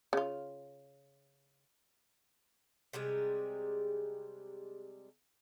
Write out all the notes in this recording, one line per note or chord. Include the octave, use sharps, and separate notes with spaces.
C#3 F4
C3 G3 G#3 G#4